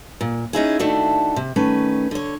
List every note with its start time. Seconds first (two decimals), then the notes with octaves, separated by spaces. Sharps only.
0.21 A#2
0.53 C#4 D#4 E4 G#4
0.79 D#3 A3 D4 E4 F#4 A4
1.36 C3
1.56 D#3 A3 C#4 B4
2.11 D3 C#5